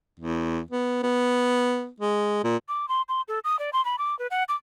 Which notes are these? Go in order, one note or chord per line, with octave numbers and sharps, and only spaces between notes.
E2
B3
B3
G#3
A#2
D6
C6
C6
A4
D#6
D5
C6
B5
D6
B4
F#5
D6